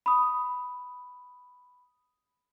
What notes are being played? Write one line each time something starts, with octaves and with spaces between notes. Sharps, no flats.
B5 D#6